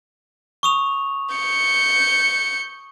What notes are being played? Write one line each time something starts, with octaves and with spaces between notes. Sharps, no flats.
C#6 D#6 F7
G6 C#7